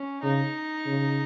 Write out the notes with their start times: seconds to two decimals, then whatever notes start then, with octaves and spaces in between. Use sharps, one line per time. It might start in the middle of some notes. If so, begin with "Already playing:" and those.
Already playing: C#4
0.23 C#3 D#4
0.86 C#3